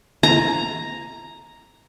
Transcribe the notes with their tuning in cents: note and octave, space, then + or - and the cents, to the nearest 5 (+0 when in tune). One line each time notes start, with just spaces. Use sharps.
A#5 +0